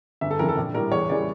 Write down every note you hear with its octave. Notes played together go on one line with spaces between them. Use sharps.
G1 E5
A4
F2 C#3 E3 A#4
A4
A#1
A2 G3 A#4
E2 C#5
C#3 E3 G3 D5